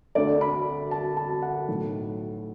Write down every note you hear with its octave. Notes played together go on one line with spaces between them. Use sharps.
D2 D3 A3 D5
B5
A5
A5
F#5
B1 A2 F#3